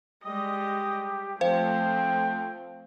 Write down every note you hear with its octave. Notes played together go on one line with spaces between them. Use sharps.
G3 G#3 G4 D#5
F3 A3 C4 C5 F5 G5